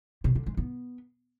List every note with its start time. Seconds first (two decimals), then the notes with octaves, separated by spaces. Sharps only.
0.24 C3
0.35 D3
0.46 G#3
0.57 B3